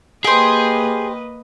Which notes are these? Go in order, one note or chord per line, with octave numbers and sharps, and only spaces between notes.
A#3 G4 G#4 B4 C5 D#5